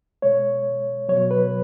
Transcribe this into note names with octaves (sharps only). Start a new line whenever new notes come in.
B2 G#3 C#5
B2 F#3 C#5
B4